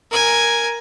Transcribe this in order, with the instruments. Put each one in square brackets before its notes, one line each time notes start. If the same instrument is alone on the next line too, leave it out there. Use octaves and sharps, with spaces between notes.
[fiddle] A#4 G#5